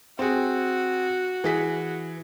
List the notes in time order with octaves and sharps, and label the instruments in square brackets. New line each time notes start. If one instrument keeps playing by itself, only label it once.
[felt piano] C4 G#4 [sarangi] F#4
[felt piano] E3 G#4 B6